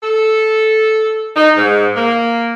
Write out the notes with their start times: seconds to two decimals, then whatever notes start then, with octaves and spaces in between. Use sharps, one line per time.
0.03 A4
1.36 D#4
1.57 G#2
1.96 A#3